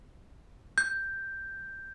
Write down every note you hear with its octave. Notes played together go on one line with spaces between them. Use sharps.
G6